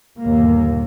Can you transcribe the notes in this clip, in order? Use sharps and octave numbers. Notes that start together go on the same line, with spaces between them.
G1 D#2 A#2 A#3